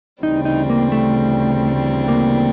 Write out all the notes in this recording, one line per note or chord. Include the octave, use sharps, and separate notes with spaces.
D2 C#3 E3 G3 C4 D#4
D#4
A#3
A3
A#3